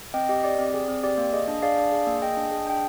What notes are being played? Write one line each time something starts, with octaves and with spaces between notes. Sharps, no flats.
C4 D#5 G5
G4 D#5
G4 D5
C4
G#4
C4
G4 D5
A#3
G#4 D#5
D4
G#4 D5 F5
D4
G#4
A#3
G#4 D#5 G5
D4
G#4
D4 G5